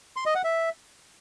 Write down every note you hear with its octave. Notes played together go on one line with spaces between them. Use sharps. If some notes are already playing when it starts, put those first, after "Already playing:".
C6
D#5
F#5
E5